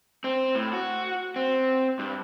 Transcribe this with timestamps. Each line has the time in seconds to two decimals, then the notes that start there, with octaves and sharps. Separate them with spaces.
0.24 C4
0.55 A2
0.73 F#4
1.36 C4
1.99 G2